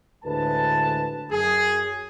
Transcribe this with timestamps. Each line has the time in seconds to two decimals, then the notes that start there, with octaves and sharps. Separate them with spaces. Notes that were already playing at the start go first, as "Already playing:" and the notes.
0.24 D2 A2 G#3 B4 A5
1.32 F#2 G#4